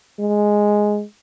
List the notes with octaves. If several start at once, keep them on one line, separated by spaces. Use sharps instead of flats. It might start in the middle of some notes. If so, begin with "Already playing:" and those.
G#3